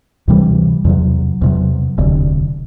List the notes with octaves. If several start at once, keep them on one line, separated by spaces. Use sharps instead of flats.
D2 C3 E3 G3
E2 C3 F#3
E2 C3 F#3
E1 D2 C3